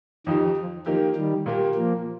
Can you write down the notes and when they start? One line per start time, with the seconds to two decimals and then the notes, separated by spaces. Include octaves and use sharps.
0.27 F2 D#3 F3 D#4 G4
0.57 F3
0.86 D#3 F3 A#3 D#4 G4
1.16 D#3 G3
1.46 A#2 A#3 G4
1.75 F3 A#3